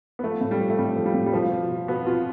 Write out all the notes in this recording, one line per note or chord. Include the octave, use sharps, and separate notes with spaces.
B3
F3 A3
A2
G3
F3
A3
A2 G3
F3
G3
A2
G3
B2 F3
B2
B2
B2 B3
B2 F4